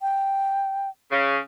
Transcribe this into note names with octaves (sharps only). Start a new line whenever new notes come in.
G5
C#3